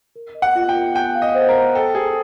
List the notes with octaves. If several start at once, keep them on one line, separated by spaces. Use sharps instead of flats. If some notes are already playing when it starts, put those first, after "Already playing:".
A#4
D#5
F#5
F4
G5
A#4
G5 G#5
F5
D#5
C5
A#4
F5
A4 G5
G#4 G5